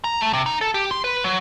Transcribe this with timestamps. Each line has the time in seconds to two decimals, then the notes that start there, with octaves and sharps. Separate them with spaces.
0.04 A#5
0.21 A3
0.33 C3
0.46 D#4
0.61 A4
0.74 G4
0.91 C6
1.04 B4
1.24 F#3